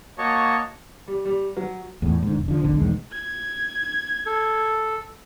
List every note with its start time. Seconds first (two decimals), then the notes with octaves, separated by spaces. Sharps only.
0.18 A#3 F#4 C#5 D#5 A5 C#6
1.08 G3
1.25 G3
1.57 F#3
2.02 E2 A2
2.23 G#2 D3
2.34 E1
2.48 D3 F3
2.60 D#1 G#1 D3
2.75 B1 E2 D#3 G#3
3.12 G#6
4.26 A4